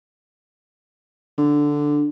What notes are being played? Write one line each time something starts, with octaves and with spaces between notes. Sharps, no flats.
D3 D4